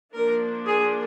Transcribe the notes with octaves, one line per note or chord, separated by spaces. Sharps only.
F3 A#3 D4 A#4
G#4